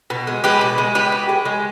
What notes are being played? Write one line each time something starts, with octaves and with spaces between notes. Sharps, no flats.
B2
G#3
G#3 G4 B4
B2
G#3
G#3 G4 B4
B2
G#3
G#3